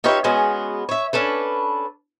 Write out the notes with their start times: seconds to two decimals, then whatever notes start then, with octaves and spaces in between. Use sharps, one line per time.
0.04 D#4 F4 G4 B4 C#5 E5
0.24 G#3 B3 C#4 F#4 G#4
0.89 C#5 E5
1.13 C#4 D4 A4 B4